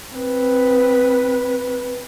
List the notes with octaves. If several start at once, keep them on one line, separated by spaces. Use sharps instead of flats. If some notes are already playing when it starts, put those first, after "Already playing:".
C4 B4